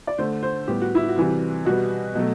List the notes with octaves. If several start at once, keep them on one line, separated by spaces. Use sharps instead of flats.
D5
D3 A3 C5
C5
A2 G3 B3 G4
F#4
E4
F#4
C3 E3 G3
B2 G3 B3 F#4
B2 F#3 A3